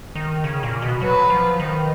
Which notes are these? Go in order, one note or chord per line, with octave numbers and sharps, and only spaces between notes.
D#3
C#3
A#2
B2
F#3 B4
F3
D#3